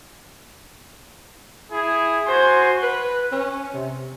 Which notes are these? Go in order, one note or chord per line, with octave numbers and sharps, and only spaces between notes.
E4 G#4
F#4 C5 G#5
B4
C#4
C3